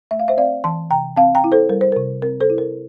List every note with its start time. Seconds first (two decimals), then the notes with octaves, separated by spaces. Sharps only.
0.11 A3 E5
0.20 F5
0.28 C5 E5
0.37 C4 D5 F5
0.64 E3 A5 C6
0.91 C3 G5 A#5
1.16 C4 F5 A5
1.35 G5 A#5
1.44 E4
1.52 A4 C5
1.69 G3 A#4
1.81 C5
1.92 A#4
1.96 C3
2.22 C4 A#4
2.40 A4 C5
2.50 E4
2.58 A#4